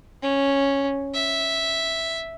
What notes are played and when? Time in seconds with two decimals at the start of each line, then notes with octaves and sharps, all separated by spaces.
0.22 C#4
1.14 E5